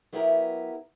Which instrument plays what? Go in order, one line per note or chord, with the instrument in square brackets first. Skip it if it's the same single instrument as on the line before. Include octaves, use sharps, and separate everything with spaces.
[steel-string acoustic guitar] F#3 B3 E4 G4 A#4